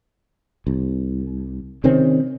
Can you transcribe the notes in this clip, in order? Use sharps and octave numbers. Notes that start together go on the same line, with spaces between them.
C2
C3 D#3 C4 C#4